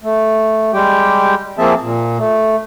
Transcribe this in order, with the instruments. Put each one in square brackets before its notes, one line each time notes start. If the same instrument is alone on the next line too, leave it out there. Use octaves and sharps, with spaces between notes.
[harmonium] A3
G3 G#3 G4 G5
F3 A#3 C4 G#4 E5 A5
A#2
A3